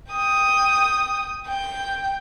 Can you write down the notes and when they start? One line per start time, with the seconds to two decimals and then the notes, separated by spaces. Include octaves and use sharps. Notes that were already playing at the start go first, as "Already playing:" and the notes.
0.12 G5 D#6
1.48 G5